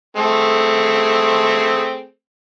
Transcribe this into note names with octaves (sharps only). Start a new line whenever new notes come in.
A3 C4 G#4